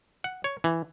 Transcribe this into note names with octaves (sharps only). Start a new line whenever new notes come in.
F#5
C#5
E3